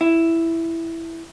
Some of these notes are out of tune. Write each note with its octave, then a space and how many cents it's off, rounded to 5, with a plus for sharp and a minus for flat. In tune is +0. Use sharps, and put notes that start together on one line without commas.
E4 +5